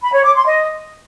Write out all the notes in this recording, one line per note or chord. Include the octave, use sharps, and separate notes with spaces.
B5
C#5
D6
C6
D#5